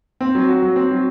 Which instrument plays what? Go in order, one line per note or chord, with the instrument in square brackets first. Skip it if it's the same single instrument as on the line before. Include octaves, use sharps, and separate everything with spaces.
[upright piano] C4
F#3
F#4
F#3
C4
F#3